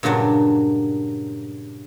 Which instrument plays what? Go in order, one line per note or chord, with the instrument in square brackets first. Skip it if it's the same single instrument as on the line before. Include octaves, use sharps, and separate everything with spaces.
[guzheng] G2 A#2 C#3 F#3 D4